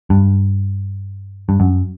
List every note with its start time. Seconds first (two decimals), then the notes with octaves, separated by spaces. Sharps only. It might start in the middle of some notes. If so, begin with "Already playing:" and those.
0.10 G2
1.49 G2
1.60 F#2